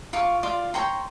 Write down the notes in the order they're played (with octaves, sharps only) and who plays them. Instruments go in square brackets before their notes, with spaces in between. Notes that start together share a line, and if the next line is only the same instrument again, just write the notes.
[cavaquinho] F4 C#6 D6
F4 D5 C6 D6
C#5 G5 A#5 C6